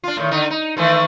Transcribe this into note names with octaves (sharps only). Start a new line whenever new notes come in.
D4 F4
A2 D#3
D3 D#4
D#4
D#3 E3 A3